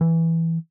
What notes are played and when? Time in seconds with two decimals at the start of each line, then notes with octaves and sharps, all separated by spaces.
0.01 E3